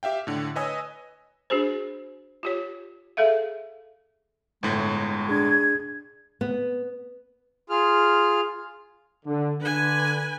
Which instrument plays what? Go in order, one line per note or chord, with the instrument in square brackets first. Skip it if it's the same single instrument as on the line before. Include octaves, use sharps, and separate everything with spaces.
[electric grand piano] G4 E5 F5 G5
A2 D3
B4 C#5 D#5 G#5 D#6 E6
[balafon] D4 F#4 G#4 C5
F4 G4 C#5
G#4 A4 E5 F5
[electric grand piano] G1 A2 [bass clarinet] G#3
[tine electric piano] D4 G#4 [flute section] G#6
[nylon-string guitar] B3
[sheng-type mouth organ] F4 G#4 F6
[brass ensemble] D3
[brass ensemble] D3 [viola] B4 G#5